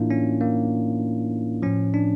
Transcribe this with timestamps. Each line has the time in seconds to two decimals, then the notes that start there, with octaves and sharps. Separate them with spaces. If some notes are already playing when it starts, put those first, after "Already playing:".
Already playing: A2 E3 A#3 D4 E4 F4
0.11 C#4
0.41 A#3
1.62 A2 F3 C#4
1.94 D4